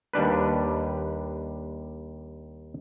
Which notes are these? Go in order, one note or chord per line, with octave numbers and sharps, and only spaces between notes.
D#2 G3 D4 B4